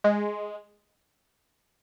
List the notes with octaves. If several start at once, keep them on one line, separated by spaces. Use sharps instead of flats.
G#3